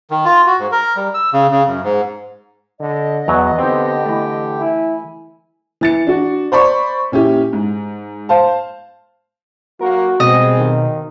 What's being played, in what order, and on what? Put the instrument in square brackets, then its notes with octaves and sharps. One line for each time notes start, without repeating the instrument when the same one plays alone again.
[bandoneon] D#3
F4
F#4
G#2
A#4
G3
E6
C#3
C#3
F#2
G#2
[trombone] D3 [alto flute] D#5
[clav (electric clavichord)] E2 F#3 A#5 [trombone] B3
[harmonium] D3 G4 G5 [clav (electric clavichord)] C4 D#4
[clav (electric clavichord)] E3 A3
[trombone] E4 [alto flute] G#5
[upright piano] E3 A6 C#7
D4 F#4
C5 D5 B5 C#6
A#2 C#4 E4 G4
G#2
C5 F5 A5
[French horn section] F#3 A#3 [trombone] F#4 [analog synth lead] A#4
[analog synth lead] B2 [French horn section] G3 G#3 C4 [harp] D#5
[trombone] D#3